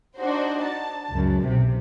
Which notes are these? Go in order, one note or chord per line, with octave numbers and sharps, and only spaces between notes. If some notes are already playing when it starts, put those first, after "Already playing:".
D4 D#4 F#4 C5
A5
C#2 F#2
B1 C3